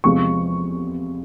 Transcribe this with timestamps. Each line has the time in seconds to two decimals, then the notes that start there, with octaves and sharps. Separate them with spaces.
0.04 E2 C3 F3 G#3 C#6